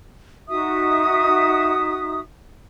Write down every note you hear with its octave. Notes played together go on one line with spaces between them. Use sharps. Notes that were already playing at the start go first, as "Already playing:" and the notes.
D#4 F#4 E5 D#6